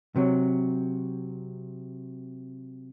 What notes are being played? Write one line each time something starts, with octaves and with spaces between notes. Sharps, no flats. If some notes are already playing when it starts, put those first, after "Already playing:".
C3 F#3